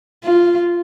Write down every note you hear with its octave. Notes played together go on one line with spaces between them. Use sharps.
F4